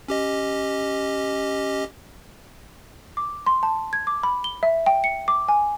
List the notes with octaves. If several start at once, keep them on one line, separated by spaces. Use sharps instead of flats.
C#4 G4 D#5
D6
C6
A5
G#6
D6
B5
G7
E5
G5
C#7
D6
G#5